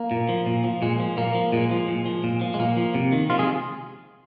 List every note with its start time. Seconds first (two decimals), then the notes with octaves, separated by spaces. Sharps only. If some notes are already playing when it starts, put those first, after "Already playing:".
Already playing: A#3
0.11 A#2
0.29 F3
0.46 A#2
0.64 F3
0.82 A#2 G#3
1.00 F3
1.17 A#2 A#3
1.35 F3
1.52 A#2 G#3
1.71 F3
1.88 A#2
2.06 F3
2.24 A#2
2.41 F3
2.54 G#3
2.59 A#2 A#3
2.77 F3
2.95 C3
3.12 D#3
3.30 C3 F3 F4
3.39 G#3 G#4